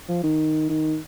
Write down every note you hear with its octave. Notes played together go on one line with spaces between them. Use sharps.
F3
D#3
D#3